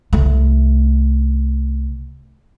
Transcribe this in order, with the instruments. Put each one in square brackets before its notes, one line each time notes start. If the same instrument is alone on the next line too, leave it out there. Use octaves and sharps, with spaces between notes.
[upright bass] C2 A3